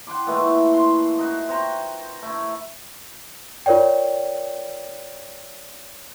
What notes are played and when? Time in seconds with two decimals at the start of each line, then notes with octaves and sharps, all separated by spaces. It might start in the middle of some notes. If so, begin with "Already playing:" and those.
0.07 F#5 G5 C6 D6
0.27 A#2 E3 G#3 A3
0.74 C6
1.18 D#4 F#4
1.49 C5 G5 A#5 C#6
2.22 A3 E4
3.66 F4 A#4 C#5 D5 G5